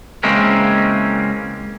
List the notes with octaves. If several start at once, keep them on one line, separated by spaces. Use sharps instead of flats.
C#3 E3 G#3 A#3 C4 C#4